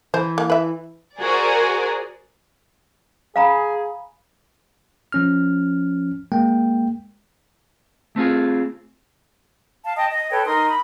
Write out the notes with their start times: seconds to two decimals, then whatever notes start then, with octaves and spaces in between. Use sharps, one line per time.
0.14 E3 C5
0.38 A#3
0.50 B4 E5
1.19 F#4 G#4 A#4 C5 D5
3.36 G#4 F5 A#5 B5
5.12 F3 C#4 F6
6.32 G#3 A#3 G5
8.16 A3 C4 F4 G#4
9.84 F5 A5
9.97 D#5 G5 A5 D#6
10.09 D#5
10.30 A4 B4 C#5 G5
10.46 D#4 A#4 C6 D#6
10.68 B5